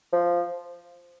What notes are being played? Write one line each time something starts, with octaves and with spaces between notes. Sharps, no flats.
F3